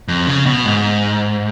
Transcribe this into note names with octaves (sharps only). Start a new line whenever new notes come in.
F2
C#3
B2
G#2